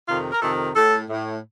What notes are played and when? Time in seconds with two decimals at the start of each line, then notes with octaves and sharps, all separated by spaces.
0.09 F2 C3 D#3 F4
0.31 A#4
0.41 F2 C3 D#3 A4
0.76 A2 A4
1.10 A2